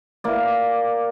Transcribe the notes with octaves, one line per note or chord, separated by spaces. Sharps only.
A#3 D5